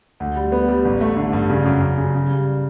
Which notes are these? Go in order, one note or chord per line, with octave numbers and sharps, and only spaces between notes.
D2
G3
B3
G3
A1
A3
D3
G2
C#3
F#2
F#2
C#3
C#3
G3